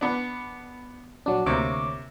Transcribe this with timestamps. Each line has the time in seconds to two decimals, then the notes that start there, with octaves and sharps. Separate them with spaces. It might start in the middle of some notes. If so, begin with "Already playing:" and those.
0.01 B3 D4
1.26 A#1 F#3 D4
1.46 D2 C3 A#3 C#5 D6